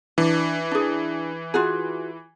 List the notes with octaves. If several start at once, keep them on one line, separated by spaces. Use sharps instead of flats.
E3 D4
D4 G#4
F4 F#4 G#4